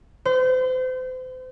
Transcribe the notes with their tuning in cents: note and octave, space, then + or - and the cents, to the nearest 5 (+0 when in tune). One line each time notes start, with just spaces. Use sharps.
C5 -35